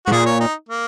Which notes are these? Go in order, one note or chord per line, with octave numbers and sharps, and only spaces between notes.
G#2 F#4
A#2 G#4
C#5
D#4
A#3